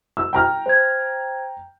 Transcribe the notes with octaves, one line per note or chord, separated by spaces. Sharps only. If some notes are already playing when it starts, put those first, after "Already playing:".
E6
G5 A#5 F6
C5 G#6